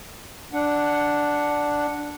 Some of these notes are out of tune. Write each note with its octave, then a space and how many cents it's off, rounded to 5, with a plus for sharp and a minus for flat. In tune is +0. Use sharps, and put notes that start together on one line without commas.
D4 +0 F#5 +0